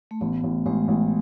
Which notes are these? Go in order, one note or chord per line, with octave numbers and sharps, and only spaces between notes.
A3
A1 B3
A1
A1 G#3
A1